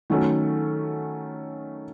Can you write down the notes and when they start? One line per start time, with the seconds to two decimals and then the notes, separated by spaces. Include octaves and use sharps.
0.10 D#3 F#3 A3 C#4